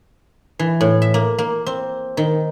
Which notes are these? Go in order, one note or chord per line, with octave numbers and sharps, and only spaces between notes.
E3
A2
E5
A#3
A#3
C4
D#3